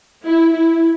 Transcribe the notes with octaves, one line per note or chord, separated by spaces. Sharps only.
E4
E4